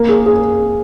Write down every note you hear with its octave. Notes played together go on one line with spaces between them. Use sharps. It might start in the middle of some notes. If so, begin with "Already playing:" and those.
Already playing: A#3
G#4
G#4